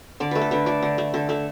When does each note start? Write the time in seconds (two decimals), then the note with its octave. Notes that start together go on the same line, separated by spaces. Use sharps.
0.20 D3 D5
0.31 A3 B4
0.41 A4
0.51 D3 B4
0.66 A3 D5
0.83 D3
0.98 A3
1.14 D3 A4
1.29 A3 A4